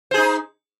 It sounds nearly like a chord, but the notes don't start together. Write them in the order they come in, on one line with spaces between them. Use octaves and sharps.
C5 G#4 D#4